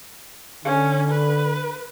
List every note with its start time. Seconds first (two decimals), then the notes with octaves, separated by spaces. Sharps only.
0.65 D3 C#4
1.11 B4